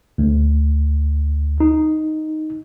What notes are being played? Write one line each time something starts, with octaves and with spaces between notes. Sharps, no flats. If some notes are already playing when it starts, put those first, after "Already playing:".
D2
D#4